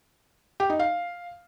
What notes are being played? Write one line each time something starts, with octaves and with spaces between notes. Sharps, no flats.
G4
D#4
F5